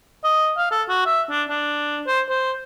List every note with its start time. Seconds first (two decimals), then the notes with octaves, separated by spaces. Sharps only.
0.24 D#5
0.57 F5
0.71 A4
0.89 F#4
1.06 E5
1.30 D4
1.50 D4
2.07 C5
2.29 C5